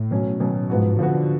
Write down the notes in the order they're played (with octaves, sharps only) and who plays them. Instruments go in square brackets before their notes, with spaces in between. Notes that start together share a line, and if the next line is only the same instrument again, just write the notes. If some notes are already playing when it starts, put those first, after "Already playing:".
Already playing: [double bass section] A2
[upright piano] B2 F#3 C#4
B2 F#3 C#4
[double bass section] G#2 [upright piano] F3 B3 F#4
[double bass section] D3 [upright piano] F3 B3 F#4